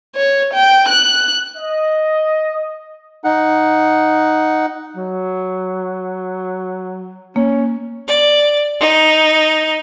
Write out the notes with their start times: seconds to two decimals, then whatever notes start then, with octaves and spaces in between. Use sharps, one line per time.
0.16 C#5
0.54 G5
0.89 F#6
1.58 D#5
3.24 D#4 F#5
4.96 F#3
7.36 A#3 C#4
8.07 D5
8.80 D#4